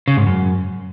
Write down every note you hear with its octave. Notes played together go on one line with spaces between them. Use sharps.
C#3
G#2
F#2